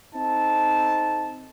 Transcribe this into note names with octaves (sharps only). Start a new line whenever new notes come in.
C4 D#4 A4 A5